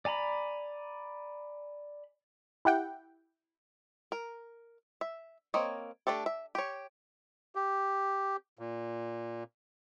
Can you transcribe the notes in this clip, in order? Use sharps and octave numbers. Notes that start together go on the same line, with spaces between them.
D5 G#5 A#5 B5
E4 G4 F#5 G5
A#4
E5
A#3 C4 C#5 D#5
A3 D4 G4 A4
E5
G4 C#5
G4
A#2